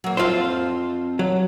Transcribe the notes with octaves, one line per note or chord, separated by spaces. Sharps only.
F#3 A#3
F2 C4 F4 C5 F5
F#3